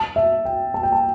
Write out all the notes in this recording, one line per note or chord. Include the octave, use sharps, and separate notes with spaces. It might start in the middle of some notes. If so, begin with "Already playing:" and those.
Already playing: A5
E5
G5
A5
G5
A5